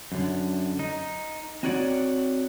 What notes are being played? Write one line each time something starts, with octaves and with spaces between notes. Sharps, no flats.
F#2 D3
D#4
C4 D#4 F#4 C#5 D5 F#5